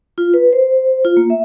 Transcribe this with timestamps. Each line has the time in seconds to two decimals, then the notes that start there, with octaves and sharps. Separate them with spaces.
0.18 F4
0.34 B4
0.53 C5
1.05 F4
1.17 A#3
1.30 E5